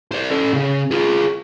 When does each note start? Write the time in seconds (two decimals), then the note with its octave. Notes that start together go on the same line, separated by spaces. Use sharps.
0.12 C5 D5
0.30 C#4 A4
0.54 C#3
0.91 F4 G#4